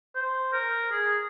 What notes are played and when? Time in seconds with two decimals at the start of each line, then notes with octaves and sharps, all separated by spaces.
0.15 C5
0.53 A#4
0.91 G#4